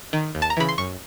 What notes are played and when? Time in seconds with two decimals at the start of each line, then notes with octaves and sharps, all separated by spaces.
0.13 D#3
0.35 D#2
0.42 A5
0.50 A#5
0.57 C#3 E3 B5
0.69 C6
0.78 F#2 C#6